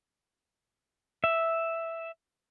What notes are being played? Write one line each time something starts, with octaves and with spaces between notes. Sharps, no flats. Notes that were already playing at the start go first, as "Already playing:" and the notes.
E5